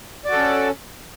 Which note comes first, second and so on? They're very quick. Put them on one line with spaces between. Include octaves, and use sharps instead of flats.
D5 F#4 A4 C#4